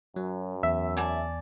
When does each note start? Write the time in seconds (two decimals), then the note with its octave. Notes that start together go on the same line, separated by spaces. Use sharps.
0.16 F#2 F#3
0.63 E2 E5
0.97 D5 G#5 A5